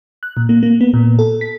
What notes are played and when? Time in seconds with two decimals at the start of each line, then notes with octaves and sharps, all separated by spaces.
0.23 F#6
0.37 A#2
0.49 A#3
0.63 A#3
0.81 B3
0.94 A#2
1.19 A4
1.41 B6